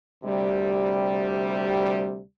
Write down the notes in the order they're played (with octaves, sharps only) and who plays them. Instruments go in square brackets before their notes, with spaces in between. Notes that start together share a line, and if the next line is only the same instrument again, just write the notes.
[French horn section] D2 C3 G3